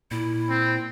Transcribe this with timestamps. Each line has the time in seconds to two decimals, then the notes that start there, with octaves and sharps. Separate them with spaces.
0.11 A#2 E4
0.50 C4